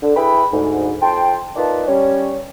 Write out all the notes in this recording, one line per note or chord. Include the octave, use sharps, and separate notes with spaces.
D3
E4 G#4 B4 G5 B5
D2 G#2
F2 G5 A5 C6
A#3 D#4 F4 B4 D5 A5
G3 C#4 C#5